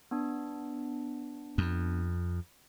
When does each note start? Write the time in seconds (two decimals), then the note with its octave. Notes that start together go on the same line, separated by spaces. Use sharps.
0.11 B3 D4
1.58 F2